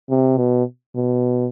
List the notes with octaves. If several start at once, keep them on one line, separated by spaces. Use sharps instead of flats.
C3
B2
B2